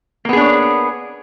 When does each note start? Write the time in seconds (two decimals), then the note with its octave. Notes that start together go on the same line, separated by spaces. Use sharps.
0.25 A#3
0.29 B3
0.33 G#4
0.37 D4
0.41 C#5